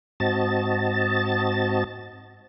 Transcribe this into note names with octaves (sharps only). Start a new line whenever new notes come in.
G#2 C4 F#4 D#5 A5 A6